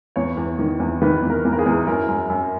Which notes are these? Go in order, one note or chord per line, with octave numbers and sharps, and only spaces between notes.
E2 C#5
E2
D#3
E2
D#3 B4
E2
A#4
E2
A#4
G#4
E2
F#2 A#4
F#2
F#2